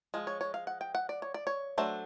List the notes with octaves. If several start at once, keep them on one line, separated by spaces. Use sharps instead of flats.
F3 G#3
C#5
C#5
F5
F#5
G5
F#5
D5
C#5
D5
C#5
F#3 A3 D4 C5